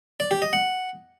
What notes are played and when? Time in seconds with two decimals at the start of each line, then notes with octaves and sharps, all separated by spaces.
0.20 D5
0.31 G4
0.42 D#5
0.53 F#5